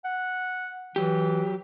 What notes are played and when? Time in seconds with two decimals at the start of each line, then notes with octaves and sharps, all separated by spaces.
0.04 F#5
0.96 E3 F#3 G4